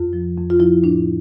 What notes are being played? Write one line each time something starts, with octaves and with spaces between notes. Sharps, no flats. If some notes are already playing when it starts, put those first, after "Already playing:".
Already playing: F2 F4
F3
F2
F4
F3 E4
A2 D4